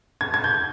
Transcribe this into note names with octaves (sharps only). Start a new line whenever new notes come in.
G#6
G#6
G6